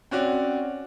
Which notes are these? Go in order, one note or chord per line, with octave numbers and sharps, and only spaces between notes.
C4 C#4 F#4 D5